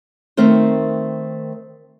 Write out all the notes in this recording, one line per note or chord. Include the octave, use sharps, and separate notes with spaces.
D#3 A3 C4 A#4 C5